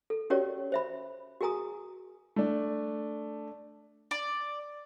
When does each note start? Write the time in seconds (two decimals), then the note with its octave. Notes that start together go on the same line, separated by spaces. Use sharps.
0.10 A4
0.30 C#4 F#4 G4 A#4 C#5 D5
0.72 C5 E5 B5
1.41 F#4 G#4 A#4 G#5 A#5 D#6
2.36 A3 D4
4.11 D5